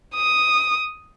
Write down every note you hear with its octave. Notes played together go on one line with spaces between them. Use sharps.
D#6